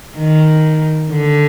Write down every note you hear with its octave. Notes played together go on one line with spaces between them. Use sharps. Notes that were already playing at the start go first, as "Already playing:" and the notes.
D#3
D3